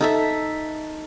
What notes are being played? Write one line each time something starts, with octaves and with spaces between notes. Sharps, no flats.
D#4 A4 E5